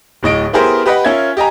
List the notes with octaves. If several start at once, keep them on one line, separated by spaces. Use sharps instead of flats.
D1 A2 D#5 D7
B3 E4 G4 G#4 A#4 C5
G4 B4 D#5 F#5 B5
C#4 F4 A#4 E5 G#6
G4 D#5 G#5 A#5